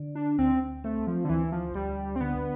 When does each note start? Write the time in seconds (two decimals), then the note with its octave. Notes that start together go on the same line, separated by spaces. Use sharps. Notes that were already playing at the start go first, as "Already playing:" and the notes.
Already playing: D3
0.15 D4
0.38 D2 C4
0.84 A3 C4
1.07 F3
1.25 D3
1.29 D2 E3
1.52 F3
1.74 D2 G3
2.16 C4
2.21 D3 B3